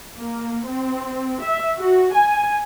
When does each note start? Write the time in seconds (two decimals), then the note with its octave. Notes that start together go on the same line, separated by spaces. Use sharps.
0.17 A#3
0.67 C4
1.43 E5
1.78 F#4
2.15 G#5